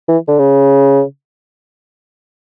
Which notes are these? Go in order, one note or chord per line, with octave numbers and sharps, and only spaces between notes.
E3
D3
C#3